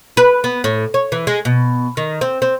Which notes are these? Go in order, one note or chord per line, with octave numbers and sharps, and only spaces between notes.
B4
B3
A2
C#5
E3
G#3
B2
D#3
C4
C4